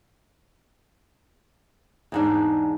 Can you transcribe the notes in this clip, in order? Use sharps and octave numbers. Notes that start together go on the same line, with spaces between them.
E2 G#2 D4